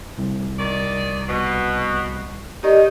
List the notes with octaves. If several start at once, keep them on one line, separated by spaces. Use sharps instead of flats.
C2
D#3 D5
B2
D#3 D#4 G4 D5 D#5